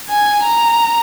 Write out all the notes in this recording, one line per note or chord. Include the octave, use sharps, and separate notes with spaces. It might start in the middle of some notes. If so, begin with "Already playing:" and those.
G#5
A#5